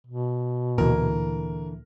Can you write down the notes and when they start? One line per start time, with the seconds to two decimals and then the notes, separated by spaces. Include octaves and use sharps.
0.07 B2
0.78 D2 A#2 D3 E3 E4 A#4